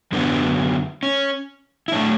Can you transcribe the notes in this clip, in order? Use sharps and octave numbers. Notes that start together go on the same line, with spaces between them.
F#2 D3 F#3 B3 D4
C#4
E4
A2 F#3 A3 D4